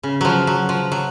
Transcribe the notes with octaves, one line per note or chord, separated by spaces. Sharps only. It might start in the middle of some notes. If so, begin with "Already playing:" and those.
C#3
F3 F#3
F#3
F3
F#3